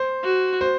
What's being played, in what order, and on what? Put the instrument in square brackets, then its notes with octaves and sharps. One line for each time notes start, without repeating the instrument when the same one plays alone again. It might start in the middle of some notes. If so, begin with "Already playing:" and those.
Already playing: [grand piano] C5
[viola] F#4
[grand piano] C5